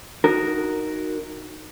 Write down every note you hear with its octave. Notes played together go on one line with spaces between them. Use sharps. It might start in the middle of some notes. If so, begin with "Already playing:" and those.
D#4 F#4 A#4